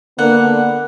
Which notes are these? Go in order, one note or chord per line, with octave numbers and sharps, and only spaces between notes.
D3 A#3 B3 F#5